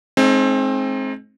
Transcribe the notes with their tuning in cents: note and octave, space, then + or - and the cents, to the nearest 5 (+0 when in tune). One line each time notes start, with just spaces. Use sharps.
G#3 +45 C4 +25 D#4 +0